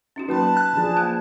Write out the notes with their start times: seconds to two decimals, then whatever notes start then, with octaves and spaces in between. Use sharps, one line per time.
0.16 C#4 D#4 F#4
0.29 F#3 A#3 B4 A5 C6
0.57 F#6
0.73 F3 D4 G#4
0.97 A#3 F5